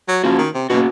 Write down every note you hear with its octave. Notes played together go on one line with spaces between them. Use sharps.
F#3
F3 A#3 C#4 F#4
D#3
C3
B2 A#3 C#4 F#4